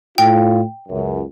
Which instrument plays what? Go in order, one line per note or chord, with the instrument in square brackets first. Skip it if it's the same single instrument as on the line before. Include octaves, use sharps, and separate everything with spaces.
[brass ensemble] A2 F4 [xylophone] G5
[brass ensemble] C#2 F#2